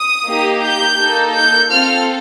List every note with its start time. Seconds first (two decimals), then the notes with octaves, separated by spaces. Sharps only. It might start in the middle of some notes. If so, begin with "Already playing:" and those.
Already playing: D#6
0.27 A#3 D#4 G4
0.62 G6
0.98 A#3 D#4 A4
1.35 G6
1.70 C4 F4 A4 F6